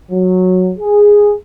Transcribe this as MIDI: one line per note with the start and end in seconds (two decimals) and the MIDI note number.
0.11 0.72 54
0.79 1.34 68